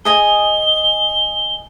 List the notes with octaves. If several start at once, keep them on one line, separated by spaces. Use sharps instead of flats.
G#4 D#5 G#5 G7